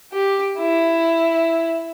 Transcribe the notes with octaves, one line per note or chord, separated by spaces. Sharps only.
G4
E4